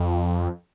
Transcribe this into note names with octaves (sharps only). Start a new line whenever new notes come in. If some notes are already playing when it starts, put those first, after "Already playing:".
Already playing: F2